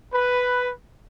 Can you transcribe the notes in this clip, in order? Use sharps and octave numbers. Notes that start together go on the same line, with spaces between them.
B4